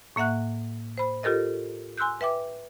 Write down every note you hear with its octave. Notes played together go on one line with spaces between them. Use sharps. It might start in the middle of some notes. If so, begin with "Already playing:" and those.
A2 A#3 E5 F#5 F#6
C5 B5
F4 G4 A4 A#4 D#5
G#5 C6 E6 F#6 G6
B4 E5 G5 D6